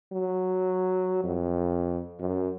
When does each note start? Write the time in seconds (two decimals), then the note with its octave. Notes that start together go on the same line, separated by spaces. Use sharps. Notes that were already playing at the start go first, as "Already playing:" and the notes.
0.12 F#3
1.24 F2
2.20 F#2